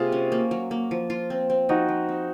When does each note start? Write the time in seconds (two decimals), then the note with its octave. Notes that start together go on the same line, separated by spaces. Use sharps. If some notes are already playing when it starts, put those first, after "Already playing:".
Already playing: C3 A#3 F4 G#4
0.12 C#4
0.32 A#3
0.51 F#3
0.71 A#3
0.91 F3
1.10 F4
1.30 C4
1.50 C4
1.69 F3 D#4 F#4
1.89 F3
2.09 C4